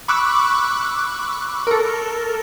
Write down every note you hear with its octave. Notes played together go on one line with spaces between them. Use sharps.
B5 C#6 D6 E6 F#6
A4 A#4